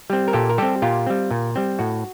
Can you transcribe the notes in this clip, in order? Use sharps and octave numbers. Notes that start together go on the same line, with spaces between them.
G3 C4
A#4
A#2 G4 A4
A#4
G3 C4 G4 A4
A#2 F4 G4
G3 C4
A#2
G3 C4
A2 F#4